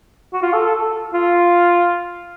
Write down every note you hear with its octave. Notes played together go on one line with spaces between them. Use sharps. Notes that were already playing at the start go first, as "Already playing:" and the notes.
F#4
F4
A4
A4
F4